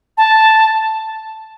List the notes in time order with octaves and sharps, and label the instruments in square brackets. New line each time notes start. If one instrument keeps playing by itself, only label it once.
[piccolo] A5